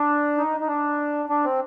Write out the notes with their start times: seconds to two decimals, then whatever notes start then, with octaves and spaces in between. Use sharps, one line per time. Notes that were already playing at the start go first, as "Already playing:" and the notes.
Already playing: D4
0.38 D#4
0.60 D#4
0.67 D4
1.29 D4
1.44 C4